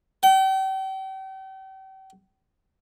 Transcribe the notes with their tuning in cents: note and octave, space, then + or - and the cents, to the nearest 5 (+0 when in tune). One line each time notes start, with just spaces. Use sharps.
G5 -40